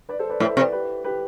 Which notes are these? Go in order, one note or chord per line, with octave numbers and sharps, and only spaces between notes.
B4 D5
A4 C5
B4 D5
A2 C5 E5
C3 B4 D5
G4 B4
G4 B4